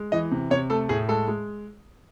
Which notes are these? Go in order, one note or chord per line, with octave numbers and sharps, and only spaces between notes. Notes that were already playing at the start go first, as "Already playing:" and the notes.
Already playing: G#3
E3 D#5
C3
C3 C#5
A3 A4
A2 G#4
G#3 A4
G#3